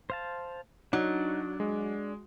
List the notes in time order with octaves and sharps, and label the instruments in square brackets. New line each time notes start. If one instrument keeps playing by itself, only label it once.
[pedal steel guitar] C5 F5 A5
[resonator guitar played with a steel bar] F#3 [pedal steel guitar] D4 D5 [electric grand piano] D#4
[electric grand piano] G#3